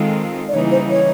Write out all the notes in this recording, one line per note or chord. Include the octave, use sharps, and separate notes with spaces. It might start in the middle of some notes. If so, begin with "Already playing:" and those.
Already playing: D#3 G#3 C4 F4 A4
D5
C#3 E3 G3 A#3 D#4 C#5
C5
C#5